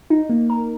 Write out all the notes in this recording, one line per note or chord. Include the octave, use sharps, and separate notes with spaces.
D#4
A#3
A#4